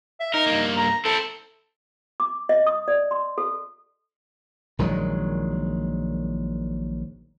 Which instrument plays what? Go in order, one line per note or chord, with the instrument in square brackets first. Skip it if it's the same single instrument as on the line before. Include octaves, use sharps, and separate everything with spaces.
[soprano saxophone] E5
[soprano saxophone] D#4 [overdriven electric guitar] A#4
[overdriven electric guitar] G2 A#3
[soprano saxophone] A#5
[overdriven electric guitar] C4 E4 [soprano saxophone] A4
[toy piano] D6
D#5
D#6
D5
C6
A4
[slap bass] A#1 D#3 F#3 G#3